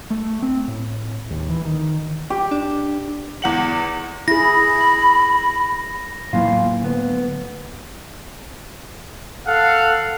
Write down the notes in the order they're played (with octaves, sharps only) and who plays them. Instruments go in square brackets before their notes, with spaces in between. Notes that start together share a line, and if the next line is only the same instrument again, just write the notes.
[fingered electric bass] A3
C4
A2
D#2
E3
D#3
[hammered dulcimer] G4
[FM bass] D4
[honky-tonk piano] E2 F#5 F#7
[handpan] E4 G#4 [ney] B5 [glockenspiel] A#6
[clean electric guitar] E2 E3 F4 [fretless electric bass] A2 F#3 A#3
[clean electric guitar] D2 B3
[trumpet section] A4 F5 F#5